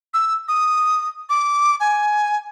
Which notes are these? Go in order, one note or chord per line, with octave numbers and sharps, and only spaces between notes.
E6
D#6
D6
G#5